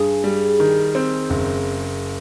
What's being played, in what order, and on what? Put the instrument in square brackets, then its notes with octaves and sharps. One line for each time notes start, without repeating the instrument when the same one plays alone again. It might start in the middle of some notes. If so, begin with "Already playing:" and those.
Already playing: [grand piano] G2 [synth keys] G#4
[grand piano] G3
D#3
C4
F#1